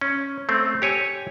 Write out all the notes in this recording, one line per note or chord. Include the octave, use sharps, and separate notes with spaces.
C#4
A3 C4
G4 C#5 G#5